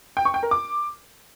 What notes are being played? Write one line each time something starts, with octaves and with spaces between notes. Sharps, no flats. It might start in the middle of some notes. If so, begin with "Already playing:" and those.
G5
C#6
G5
A#4
D6